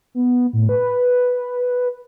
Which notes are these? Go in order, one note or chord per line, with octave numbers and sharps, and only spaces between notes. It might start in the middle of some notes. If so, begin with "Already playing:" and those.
B3
A2
B4